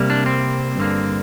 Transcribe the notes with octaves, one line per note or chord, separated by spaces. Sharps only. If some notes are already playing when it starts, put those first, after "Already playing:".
Already playing: C2 C3 G3 A#3
D4
C4
G2 D3 A#3